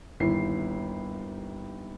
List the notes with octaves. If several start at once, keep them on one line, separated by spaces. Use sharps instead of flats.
G1 D#2 E4 C7